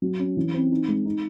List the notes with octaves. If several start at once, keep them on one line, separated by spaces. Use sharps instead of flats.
F#3
C#4
E3
C4
D#4
G#3
D#4